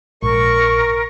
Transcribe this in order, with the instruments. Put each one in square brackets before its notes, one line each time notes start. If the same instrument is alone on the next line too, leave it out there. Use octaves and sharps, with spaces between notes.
[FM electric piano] A#1 G#2 [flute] A#4 [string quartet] C#6